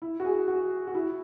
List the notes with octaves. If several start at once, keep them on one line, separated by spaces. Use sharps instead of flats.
E4
F#4
G#4
F#4
F#4
E4